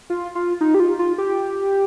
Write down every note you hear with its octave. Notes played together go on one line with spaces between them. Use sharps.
F4
F4
D#4
G4
F4
F4
G4